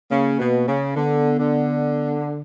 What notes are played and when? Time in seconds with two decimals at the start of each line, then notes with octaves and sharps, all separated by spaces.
0.10 C#3 A#3
0.39 B2
0.67 C#3
0.96 D3 B3
1.38 D3